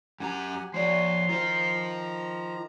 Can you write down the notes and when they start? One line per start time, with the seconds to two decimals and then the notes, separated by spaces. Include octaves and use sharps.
0.20 F#2 G4 F#5 G#5 A#5
0.74 F3 F#4 C#5 D5 C6
1.29 D#3 F4 C5 A#5